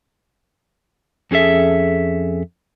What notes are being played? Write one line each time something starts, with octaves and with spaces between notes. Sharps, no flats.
F2 C#4 G#4 A4 E5